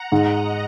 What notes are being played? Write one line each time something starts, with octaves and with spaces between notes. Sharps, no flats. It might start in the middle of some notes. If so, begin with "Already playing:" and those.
Already playing: F#5 A#5
G#2 D#5 F#5